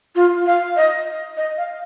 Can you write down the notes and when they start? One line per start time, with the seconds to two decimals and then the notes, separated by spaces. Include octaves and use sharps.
0.15 F4
0.46 F5
0.76 D#5
1.37 D#5
1.57 F5